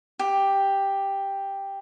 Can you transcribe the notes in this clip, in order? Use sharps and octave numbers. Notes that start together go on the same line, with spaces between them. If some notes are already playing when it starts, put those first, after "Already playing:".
G4